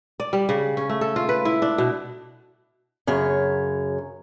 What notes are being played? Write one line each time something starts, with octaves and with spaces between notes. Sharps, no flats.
D5
G3
C#3
C#4
A3
A4
F4
B4
E4
D4
B2
F#2 C#3 C#5